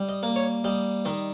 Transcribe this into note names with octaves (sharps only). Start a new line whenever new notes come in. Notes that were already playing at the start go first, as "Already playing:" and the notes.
Already playing: G3
D#5
A#3
C#5
G3 D#5
D#3 D#5